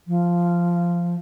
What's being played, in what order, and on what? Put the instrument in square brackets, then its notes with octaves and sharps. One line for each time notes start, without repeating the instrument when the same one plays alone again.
[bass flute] F3